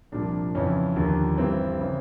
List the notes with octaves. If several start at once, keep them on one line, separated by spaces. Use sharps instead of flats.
C2 A#2 F3 D4
F2 C#3 E3 C#4
D#2 D3 F3
G2 E3 C4
C#3 E3